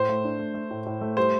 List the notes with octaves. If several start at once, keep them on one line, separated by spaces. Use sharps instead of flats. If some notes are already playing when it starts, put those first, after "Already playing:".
Already playing: A2 C5
A3
D4
A3
A3
A2
A2
A3
G3 C5